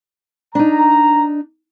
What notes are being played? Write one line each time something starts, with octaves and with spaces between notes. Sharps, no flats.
D4 D#4 A#5